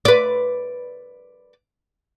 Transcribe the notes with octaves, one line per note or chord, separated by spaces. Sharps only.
B4 D5